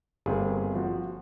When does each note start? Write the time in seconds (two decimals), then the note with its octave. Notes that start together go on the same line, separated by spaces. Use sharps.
0.26 G1 A#3 C4 G#4
0.74 F3 F#4